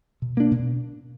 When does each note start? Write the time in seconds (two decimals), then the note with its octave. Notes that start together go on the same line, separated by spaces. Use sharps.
0.22 B2
0.37 A#3 D4
0.51 B2